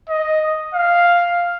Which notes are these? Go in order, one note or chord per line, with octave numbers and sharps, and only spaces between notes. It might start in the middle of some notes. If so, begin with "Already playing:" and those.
D#5
F5